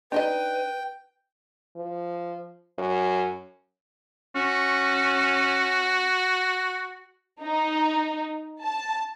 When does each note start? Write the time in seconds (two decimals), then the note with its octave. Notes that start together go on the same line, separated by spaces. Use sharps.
0.12 D4 D#4 B4 D#5 G5
1.76 F3
2.78 F#2
4.36 C#4 F#4
7.42 D#4
8.62 A5